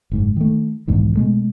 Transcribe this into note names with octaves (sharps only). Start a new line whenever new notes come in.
F#1 G#2
D#3 A3
B1 E2 G#2 D#3
B2 G#3 A3